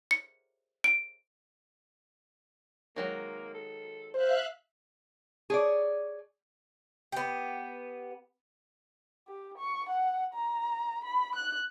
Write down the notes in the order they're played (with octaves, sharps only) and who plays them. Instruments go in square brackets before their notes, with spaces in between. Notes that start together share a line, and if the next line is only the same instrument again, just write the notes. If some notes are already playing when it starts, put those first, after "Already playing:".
[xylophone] C#7
D7
[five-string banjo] D#3 F#3 G#3 [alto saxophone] A#3
[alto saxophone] A4
[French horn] C5 [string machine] E5 F5 F#6
[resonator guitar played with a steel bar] G#4 C#5 D5
[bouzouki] B3 G4
[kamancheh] G4
C#6
F#5
A#5
B5
F#6